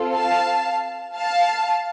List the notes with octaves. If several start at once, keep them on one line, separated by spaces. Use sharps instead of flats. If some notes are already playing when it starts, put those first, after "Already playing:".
Already playing: C4 F4 A4
F5 A5
F5 A5